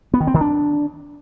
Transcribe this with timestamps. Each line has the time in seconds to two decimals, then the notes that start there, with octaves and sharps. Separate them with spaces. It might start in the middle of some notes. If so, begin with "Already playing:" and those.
0.14 B3
0.20 D#3
0.27 C4
0.34 D#3
0.41 D4